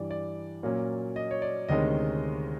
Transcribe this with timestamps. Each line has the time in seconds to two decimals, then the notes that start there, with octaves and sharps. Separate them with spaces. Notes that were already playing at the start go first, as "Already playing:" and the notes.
Already playing: G2 E3 G3 D5
0.11 D5
0.63 A#2 F#3 A#3 C#4
1.16 D#5
1.31 C#5
1.42 D5
1.69 D2 C3 D#3 G#3 C#4 D#5